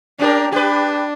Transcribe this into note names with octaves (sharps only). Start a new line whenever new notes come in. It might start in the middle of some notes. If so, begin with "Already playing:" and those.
C#4 D4 G4 A#4
D4 G4 B4